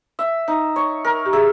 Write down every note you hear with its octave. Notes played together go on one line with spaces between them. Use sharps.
E5
D#4
C#5
A#4
G4
G#4 E5